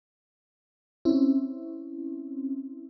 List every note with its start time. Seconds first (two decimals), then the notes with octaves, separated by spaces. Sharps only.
1.05 C4 C#4 E4